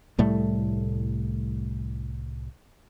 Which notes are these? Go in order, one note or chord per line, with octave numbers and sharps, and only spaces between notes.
C2 A2 G3 A3